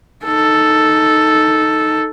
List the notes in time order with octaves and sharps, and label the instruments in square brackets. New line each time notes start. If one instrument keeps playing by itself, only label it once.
[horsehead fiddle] D#4 A4